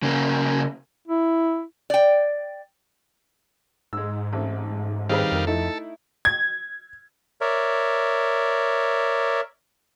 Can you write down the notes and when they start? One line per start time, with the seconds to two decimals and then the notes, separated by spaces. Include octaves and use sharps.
0.03 C#3 A#3
1.08 E4
1.90 D5 G5
3.93 G#2 G#3 E6
4.33 A1 C4
5.09 D#3 G3 C4 G#4 B4 F5
5.32 F2 C4 A#4
5.47 A3 D#4 E4 A4
6.25 G#6
7.41 A#4 C#5 D5 E5